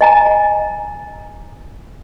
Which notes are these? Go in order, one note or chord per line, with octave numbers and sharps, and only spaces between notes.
D#5 G#5 A#5